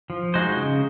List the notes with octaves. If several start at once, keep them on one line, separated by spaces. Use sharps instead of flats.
F3
G#3 D#4 F#4 C5
C#3